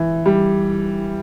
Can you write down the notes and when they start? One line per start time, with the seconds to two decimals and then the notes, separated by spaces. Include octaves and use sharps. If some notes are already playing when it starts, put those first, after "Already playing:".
Already playing: E3
0.26 G3